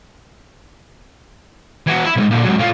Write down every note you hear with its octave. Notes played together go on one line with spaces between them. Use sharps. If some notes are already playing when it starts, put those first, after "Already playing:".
E3 F#4
E4
B1 G#2
A#2 D3
G#2 F#3
A2 F4